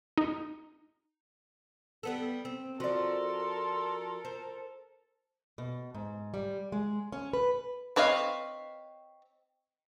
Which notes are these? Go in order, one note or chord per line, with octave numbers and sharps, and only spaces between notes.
D#4
G3 B3 A4
C4
F3 F#4 A4 A#4 D5 C6
C5
B2
G#2
G3
G#3
C#4
B4
C4 B4 C#5 D#5 F5